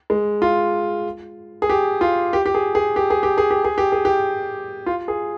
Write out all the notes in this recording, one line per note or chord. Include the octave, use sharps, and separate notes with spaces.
G#3
F4
G#4
G4
F4
G4
G4
G#4
G#4
G4
G#4
G4
G#4
G4
G#4
G4
G#4
G4
F4
G#4